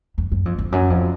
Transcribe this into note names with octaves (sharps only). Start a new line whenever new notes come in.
F2
F#2
F2
F2
F#2
F2